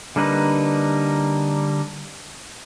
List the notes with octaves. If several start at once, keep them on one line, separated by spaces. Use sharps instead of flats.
D3 G3 A#3 D#4 B4